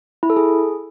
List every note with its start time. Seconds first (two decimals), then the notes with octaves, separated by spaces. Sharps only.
0.23 E4
0.30 A4
0.37 G#4